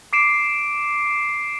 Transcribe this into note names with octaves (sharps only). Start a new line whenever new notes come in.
D6 C7 D7 E7